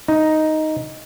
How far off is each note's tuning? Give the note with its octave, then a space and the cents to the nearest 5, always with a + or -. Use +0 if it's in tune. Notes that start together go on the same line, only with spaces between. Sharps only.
D#4 +5